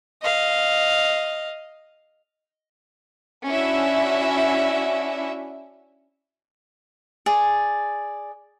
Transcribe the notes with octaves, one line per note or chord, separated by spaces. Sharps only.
D#5 F5
C#4 D4 E4 F#4 E5
G#4 D5